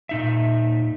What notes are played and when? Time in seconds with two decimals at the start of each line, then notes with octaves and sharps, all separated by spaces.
0.09 A#2 D#4 E5